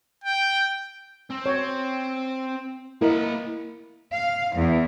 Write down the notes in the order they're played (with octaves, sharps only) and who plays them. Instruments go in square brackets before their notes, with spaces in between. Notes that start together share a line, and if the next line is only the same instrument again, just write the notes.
[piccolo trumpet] G5
[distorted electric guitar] C4
[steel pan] C#5
[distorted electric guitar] A#3 B5 [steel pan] E4 A#4 D#5
[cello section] F5
E2